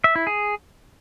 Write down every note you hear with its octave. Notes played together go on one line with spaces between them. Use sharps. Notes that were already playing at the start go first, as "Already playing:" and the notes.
E5
E4
G#4